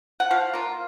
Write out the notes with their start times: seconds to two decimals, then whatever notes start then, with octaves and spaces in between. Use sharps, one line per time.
0.20 F#5
0.31 F3 F5
0.53 A#3 F4